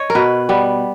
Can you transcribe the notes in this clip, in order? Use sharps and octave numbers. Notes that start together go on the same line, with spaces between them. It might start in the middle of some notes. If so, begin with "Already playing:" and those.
Already playing: C#5 D#5
A#4
B2 B4
G3 B3